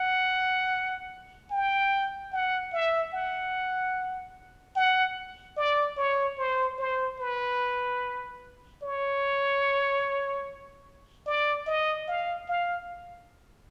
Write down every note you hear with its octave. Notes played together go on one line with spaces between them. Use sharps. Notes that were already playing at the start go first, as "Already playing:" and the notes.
Already playing: F#5
G5
F#5
E5
F#5
F#5
D5
C#5
C5
C5
B4
C#5
D5
D#5
F5
F5